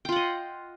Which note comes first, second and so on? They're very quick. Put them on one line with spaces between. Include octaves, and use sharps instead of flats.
G5 F4 F#5 D#5